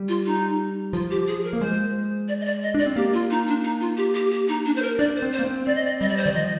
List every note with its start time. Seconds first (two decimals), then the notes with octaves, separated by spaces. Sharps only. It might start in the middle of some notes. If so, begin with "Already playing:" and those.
Already playing: G3
0.08 F4
0.26 D#4
0.93 F3 F4
1.11 G4
1.28 G#4
1.44 A#4
1.53 A#3
1.61 G#3 C5
2.28 D5
2.41 D#5
2.45 D5
2.63 D#5
2.74 D4 D5
2.86 C4
2.96 A#3 G4
3.13 F4
3.30 D#4
3.47 D4
3.64 D#4
3.81 F4
3.97 G4
4.14 G4
4.31 G4
4.48 D#4
4.66 D4
4.76 C5
4.82 A#4
4.99 D4 D5
5.16 C5
5.22 C4
5.33 C5
5.39 A#3
5.44 C4
5.66 C4 D5
5.75 D#5
5.84 D5
6.01 G3 D#5
6.09 D5
6.17 C5
6.24 D#3 D5
6.34 F3 D#5